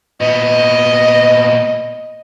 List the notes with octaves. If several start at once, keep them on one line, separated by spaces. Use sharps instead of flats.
A#2 B3 D#5